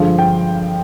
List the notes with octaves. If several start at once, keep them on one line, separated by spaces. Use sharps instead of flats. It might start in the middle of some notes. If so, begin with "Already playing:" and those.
Already playing: G2 D3 F3 G#3 F5
G5